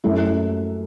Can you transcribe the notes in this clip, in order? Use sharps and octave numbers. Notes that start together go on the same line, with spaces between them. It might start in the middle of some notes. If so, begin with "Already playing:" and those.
F#2 F#3 A3 E4
E4